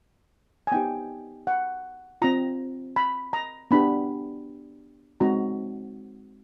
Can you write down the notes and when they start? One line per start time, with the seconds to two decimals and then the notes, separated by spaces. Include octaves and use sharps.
0.67 G#5
0.72 B3 D#4 G4 G5
1.47 F#5
2.22 C4 F4 A#5
2.96 B5
3.33 A#5
3.71 B3 D4 G4 B5
5.20 G#3 C4 D#4 F#4 A#5